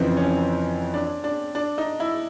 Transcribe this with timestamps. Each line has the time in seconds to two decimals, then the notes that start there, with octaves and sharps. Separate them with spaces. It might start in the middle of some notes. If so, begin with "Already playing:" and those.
Already playing: F2 C#3 E3 C4
0.17 C#4
0.94 D4
1.24 D4
1.55 D4
1.78 D#4
2.00 E4